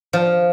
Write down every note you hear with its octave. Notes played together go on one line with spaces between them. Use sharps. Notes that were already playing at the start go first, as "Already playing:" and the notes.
F3